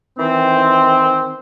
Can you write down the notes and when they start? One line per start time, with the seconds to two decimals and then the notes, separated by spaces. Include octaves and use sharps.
0.18 D#3 E3 C4